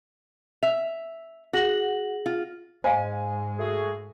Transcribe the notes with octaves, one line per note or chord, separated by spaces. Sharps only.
E5 F7
F#4 G#4 A#6 F#7
F4
G#2 G#3 C5 D#5 F5 G#5
A3 F#4 G#4